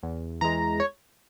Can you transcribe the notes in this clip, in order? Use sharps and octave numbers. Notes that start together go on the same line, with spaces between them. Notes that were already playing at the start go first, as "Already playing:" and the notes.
E2
E3 G#3 A#5
C#5